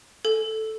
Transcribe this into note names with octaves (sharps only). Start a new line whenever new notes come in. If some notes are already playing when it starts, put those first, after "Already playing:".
A4